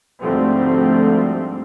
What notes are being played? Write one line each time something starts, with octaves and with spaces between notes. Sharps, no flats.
D2 G#2 F3 G3 A3 C4